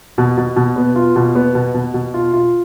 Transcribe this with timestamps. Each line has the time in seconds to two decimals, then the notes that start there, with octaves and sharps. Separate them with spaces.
0.18 B2
0.37 B2
0.56 B2
0.76 B3
0.96 F4
1.16 B2
1.35 B3
1.55 B2
1.74 B2
1.94 B2
2.14 F4
2.33 F4